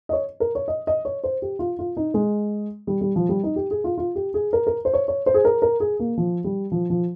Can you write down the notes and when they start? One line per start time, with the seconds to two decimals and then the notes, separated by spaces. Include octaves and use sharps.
0.09 D#5
0.13 C#5
0.40 A#4
0.55 C#5
0.68 D#5
0.87 D#5
1.05 C#5
1.24 C5
1.42 G4
1.59 F4
1.79 F4
1.97 D#4
2.14 G#3
2.87 G3
3.01 G3
3.16 F3
3.29 G3
3.43 D#4
3.56 G4
3.71 G#4
3.84 F4
3.98 F4
4.15 G4
4.34 G#4
4.53 A#4
4.67 A#4
4.85 C5
4.94 C#5
5.08 C#5
5.26 C5
5.34 G#4
5.45 A#4
5.62 A#4
5.80 G#4
6.00 A#3
6.17 F3
6.44 G3
6.72 F3
6.90 F3